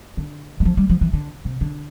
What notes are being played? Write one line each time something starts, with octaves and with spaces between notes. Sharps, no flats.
D3
G3
F3
G3
F3
E3
D3
C3
D3